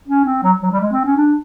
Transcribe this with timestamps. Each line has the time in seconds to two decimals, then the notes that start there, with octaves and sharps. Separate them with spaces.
0.08 C#4
0.25 C4
0.43 F#3
0.62 F#3
0.71 G3
0.80 G#3
0.92 C4
1.05 C#4
1.17 D4